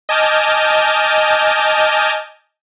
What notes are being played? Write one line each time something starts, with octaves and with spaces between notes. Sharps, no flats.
D#5 G#5 A5 D6 F6 G6